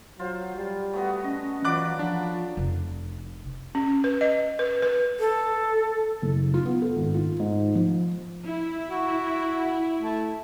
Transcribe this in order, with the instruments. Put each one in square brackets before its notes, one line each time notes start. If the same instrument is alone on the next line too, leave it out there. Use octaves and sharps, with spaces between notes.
[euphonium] F#3 [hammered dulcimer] F4 C5
[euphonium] G3
[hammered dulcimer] A3 B3 F#4
[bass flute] C#4 [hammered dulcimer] D#5
[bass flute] E3 [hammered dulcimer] F#3 B4 D5 [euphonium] F4 [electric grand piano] D6 F#6
[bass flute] F3 [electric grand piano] D4
[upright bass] F1
[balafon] C#4
B4
D#5
B4
B4
[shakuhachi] A4
[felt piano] F#1
F4
B3
A4
G#1
F4
G#2
F3
[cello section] E4
[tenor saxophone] F#4
A3